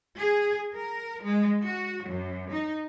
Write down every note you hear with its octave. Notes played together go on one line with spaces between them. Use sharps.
G#4
A#4
G#3
F#4
F#2
D#4